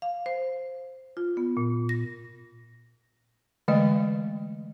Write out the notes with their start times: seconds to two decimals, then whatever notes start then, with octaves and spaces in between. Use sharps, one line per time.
0.02 F5
0.26 C5
1.17 F4
1.37 B3
1.57 A#2
1.89 A#6
3.68 D3 E3 G#3 A3 D#5